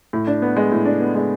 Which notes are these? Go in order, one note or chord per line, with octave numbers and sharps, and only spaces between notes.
A2
D4
B3
G#3
A2
D4
B3
G#3